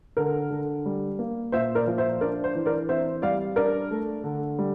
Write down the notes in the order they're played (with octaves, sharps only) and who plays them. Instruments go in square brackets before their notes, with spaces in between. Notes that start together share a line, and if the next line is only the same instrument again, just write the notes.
[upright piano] D3 A#4
D3
G3
A#3
A#2 C5 E5
A#4 D5
F3
C5 E5
D4 A#4 D5
C5
E3
A#4 D5
C4 C5 E5
G3 D5 F5
D4 A#4 D5
A3
D3
G3